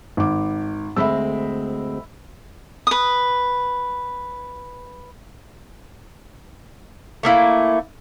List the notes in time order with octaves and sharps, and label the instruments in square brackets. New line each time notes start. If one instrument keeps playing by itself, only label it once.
[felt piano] G#1 D6
[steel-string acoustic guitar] D2 G#3 C4 [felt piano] E5 B5 E6
[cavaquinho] B4 D#6
[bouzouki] A3 A#3 E4